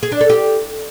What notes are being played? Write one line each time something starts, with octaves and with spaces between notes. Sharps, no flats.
G#4
D4
A4
G4